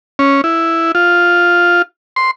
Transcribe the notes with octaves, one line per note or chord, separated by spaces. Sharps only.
C#4
E4
F4
C6